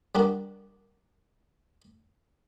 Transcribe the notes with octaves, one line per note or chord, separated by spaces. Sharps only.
G3 D4 F#4 A#4